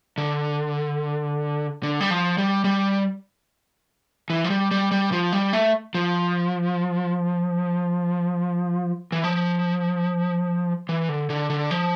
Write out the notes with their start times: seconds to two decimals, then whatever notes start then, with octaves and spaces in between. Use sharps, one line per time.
0.18 D3
1.83 D3
2.00 G3
2.10 F3
2.38 G3
2.65 G3
4.30 E3
4.44 F3
4.50 G3
4.71 G3
4.91 G3
5.12 F3
5.32 G3
5.53 A3
5.94 F3
9.12 E3
9.24 F3
10.89 E3
11.09 D3
11.30 D3
11.50 D3
11.71 F3